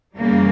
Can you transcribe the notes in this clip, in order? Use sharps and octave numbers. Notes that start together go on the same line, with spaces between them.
F#2 C#3 E3 G3 A#3